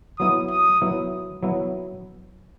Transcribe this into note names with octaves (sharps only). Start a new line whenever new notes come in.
F#3 B3 E4 D#6
D#6
F#3 B3 E4
F#3 B3 E4